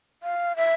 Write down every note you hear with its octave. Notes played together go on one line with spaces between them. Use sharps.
F5
E5